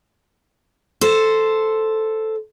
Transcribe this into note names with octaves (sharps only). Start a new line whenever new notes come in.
A4 C5